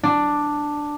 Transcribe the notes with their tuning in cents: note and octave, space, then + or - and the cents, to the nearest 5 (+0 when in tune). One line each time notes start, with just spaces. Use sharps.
D4 +5